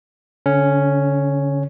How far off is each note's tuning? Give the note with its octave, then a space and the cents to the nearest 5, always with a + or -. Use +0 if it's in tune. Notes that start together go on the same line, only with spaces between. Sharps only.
D3 -35 C#4 +0